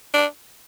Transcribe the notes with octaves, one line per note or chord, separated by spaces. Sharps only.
D4